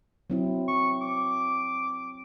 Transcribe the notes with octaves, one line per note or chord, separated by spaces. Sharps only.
F#3 C4 E4
C#6
D6